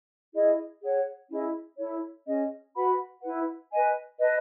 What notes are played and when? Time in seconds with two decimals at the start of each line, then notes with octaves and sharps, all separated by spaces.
0.33 E4 G#4 D#5
0.81 G#4 C#5 F#5
1.29 C#4 E4 G#4 D#5
1.77 E4 A4 C#5
2.26 C#4 G#4 D#5
2.75 F#4 B4 F#5 B5
3.22 E4 B4 F#5
3.70 B4 D#5 G#5
4.19 B4 D#5 A5